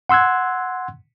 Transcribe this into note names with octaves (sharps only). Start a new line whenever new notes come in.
F#5 C6 E6 F#6 G#6